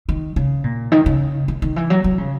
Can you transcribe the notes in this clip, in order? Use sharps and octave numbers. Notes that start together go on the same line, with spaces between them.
D#3
C#3
A#2
D#3
C#3
D#3
D#3
E3
F#3
F#3
C#3